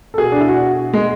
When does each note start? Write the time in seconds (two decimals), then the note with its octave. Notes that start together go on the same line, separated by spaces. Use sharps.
0.14 A4
0.18 B2 G#4
0.32 D4
0.40 E4
0.48 F#4
0.93 G#3